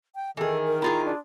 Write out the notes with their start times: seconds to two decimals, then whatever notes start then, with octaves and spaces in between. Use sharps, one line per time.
0.15 G5
0.37 D#3 E3 G#4 A4
0.67 A#4
0.82 E4 F4 G#4 A#5
1.05 D4